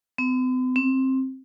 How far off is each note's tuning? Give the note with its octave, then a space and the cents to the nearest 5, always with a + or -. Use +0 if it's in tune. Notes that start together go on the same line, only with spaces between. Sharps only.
C4 -45
C4 +15